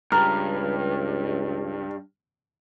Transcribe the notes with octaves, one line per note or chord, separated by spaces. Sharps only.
C#2 G2 A#5 F6